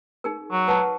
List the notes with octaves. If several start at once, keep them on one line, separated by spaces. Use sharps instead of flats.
D#4 G#4 A#4
F#3
B4 F#5 A5